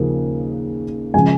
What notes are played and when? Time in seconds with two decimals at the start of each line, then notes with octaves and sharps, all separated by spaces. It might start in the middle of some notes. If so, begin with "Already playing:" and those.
Already playing: D#2 C#3 F3 A#3
1.14 C#3 F3 G#3 G#5